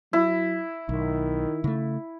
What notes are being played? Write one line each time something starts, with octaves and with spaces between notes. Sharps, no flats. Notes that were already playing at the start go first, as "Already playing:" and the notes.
F#3 E4
B1 D#3
C#3 A3